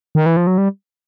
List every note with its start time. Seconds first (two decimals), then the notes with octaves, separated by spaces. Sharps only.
0.15 D#3
0.26 E3
0.37 F3
0.47 F#3
0.58 G3